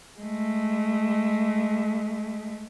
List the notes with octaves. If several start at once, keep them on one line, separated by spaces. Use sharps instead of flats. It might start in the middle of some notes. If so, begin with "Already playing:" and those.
G#3 A3